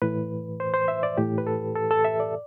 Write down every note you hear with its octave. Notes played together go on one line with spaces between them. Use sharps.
A2 E3 B4
C5
C5
E5
D5
A2 E3 G4
B4
A4
A4
A4
E5
D5